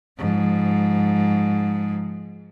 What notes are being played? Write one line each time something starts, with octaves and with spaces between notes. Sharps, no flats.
G#2 F3